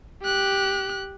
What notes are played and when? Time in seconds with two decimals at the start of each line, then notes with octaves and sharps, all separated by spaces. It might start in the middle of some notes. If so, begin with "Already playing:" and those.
0.22 G4 F#6